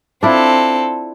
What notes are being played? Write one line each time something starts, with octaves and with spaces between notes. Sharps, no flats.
C4 D4 E4 F4 A4